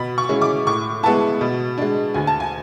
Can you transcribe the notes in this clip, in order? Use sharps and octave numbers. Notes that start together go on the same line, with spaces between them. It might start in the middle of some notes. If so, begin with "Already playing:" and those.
Already playing: B2 B5
C#6
G#3 C#4 E4
D6
A2 C#6
G#3 B3 E4 A5
B2
G#3 D4
D2 G#5
A5
G#5